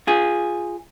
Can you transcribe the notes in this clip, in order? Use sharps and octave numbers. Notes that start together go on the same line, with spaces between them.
F4 G#4